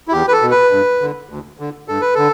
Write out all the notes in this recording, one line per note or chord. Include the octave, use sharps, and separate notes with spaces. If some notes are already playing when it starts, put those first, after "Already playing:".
E4
E2 G4
B4
A4
B2
B4
G2
D3
D2
D3
G2 A4
B4
D3 A4